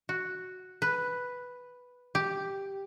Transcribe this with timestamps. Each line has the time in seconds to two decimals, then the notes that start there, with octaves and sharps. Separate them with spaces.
0.09 F#4
0.82 B4
2.15 G4